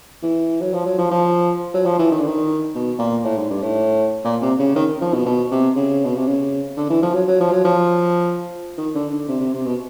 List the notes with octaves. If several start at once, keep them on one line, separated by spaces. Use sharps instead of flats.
E3
F#3
F3
F#3
F3
F3
F#3
F3
E3
D#3
D3
D#3
B2
A#2
A2
G#2
G2
A2
A#2
C3
C#3
D#3
F3
B2
B2
C3
C#3
B2
C3
C#3
D3
E3
F3
F#3
F#3
F3
F#3
F3
D#3
D3
D3
C3
C3
C3
B2